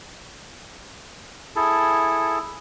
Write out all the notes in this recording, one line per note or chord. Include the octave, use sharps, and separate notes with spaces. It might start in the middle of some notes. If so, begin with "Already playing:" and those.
E4 G#4 A4 A5